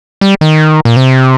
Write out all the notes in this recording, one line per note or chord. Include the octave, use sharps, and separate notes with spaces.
G3
D#3
A#2
C3